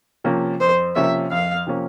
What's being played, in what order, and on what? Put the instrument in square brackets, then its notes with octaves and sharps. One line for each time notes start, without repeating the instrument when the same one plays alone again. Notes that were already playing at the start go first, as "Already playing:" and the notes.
[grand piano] C3 F3 A#3 C#4
[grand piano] F2 [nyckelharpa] C5
[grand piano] C3 F3 A#3 C#4 [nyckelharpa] E5
[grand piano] F2 [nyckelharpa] F5
[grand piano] C3 F3 A#3 C#4